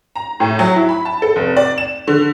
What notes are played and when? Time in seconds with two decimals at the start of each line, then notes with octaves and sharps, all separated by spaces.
0.16 A#5
0.40 A2
0.59 F#3
0.76 E4
0.89 B5
1.05 A5
1.22 A4
1.36 F1
1.56 D5
1.78 E7
2.08 D3